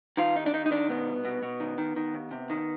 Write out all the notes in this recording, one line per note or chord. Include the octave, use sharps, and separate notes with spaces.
D#3 F4
D#2 D#4
D4
D#3 D#4
D#4
D#3 D4
B2 B3
C2
B2
B2
D#3
D#3
D#3
D#2
C3
D#3